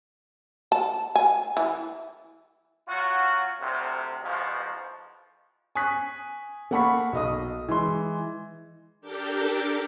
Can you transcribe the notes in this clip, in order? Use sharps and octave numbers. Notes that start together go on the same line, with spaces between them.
A5
G#5
E3
F#3 F4 F#4
D2 C3
A1 G#2 B2 F3
G#5 C#6 D#6 F#6 B6
A#3 A4 F#5 B5 C#6 B6
B1 D#5 D#6
E3 G#3 C6
D4 G4 A4 A#4 D6 G6